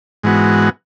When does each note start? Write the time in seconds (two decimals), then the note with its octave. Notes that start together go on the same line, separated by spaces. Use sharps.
0.23 G#2 E3 G#3 B3 F#4